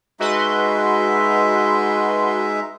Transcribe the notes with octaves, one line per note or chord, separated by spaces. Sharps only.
G#3 D#4 F#4 B4 E5 C6